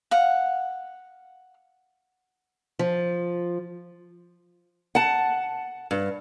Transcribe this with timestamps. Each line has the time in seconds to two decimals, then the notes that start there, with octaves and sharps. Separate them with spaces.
0.11 F5 F#5
2.79 F3
4.95 F#5 A5
5.91 G2